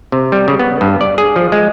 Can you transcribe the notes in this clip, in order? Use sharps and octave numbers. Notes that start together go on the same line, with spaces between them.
C3
G3
C#3
B3
G2
D5
G#4
F3
G#3